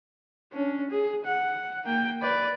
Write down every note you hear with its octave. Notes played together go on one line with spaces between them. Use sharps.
C#4 D4
G#4
F#5
A#3 G5
B4 D5